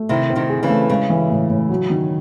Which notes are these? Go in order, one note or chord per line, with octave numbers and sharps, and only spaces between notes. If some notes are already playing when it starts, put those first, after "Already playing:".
Already playing: A3
C3 D#3 E4
C4
C3 D#3
G#4
C#3 E3
A3
C#3 G#3
E3
A2
A2
F#3
D#3